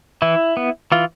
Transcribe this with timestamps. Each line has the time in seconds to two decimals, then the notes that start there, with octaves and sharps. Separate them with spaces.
0.22 E3 E4
0.57 B3
0.92 E3 F4